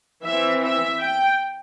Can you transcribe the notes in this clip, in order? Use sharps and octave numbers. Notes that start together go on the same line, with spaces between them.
E3 C4 E5
E5
G5